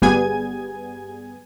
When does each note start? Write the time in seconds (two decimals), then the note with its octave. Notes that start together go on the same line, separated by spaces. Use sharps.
0.02 G1 G3 B3 G#4 G#5 G#6